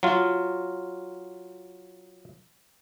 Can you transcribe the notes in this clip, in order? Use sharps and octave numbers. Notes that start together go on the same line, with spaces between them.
F#3 F4